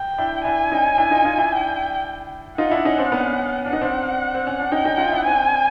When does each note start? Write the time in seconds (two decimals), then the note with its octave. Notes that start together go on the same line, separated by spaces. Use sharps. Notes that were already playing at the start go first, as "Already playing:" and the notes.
Already playing: G5
0.18 D4 E4
0.45 D4 E4 G#5
0.72 C#4 D#4
0.98 D4 E4
1.11 D#4 F4
1.25 D#4 F4
1.38 D4 E4
1.52 G5
2.58 D#4 F4 F#5
2.71 D4 E4
2.85 C#4 D#4
2.98 C4 D4
3.12 B3 C#4
3.65 D4 F#5
3.73 D#4
3.81 C4 D4
4.34 C4
4.47 C#4
4.60 D4
4.71 C#4 D#4 G5
4.85 C#4 D#4
4.98 D#4 F4
5.12 D4 E4
5.25 C4 D4 G#5